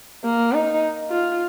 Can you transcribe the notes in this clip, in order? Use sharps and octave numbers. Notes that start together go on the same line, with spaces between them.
A#3
D#4
F4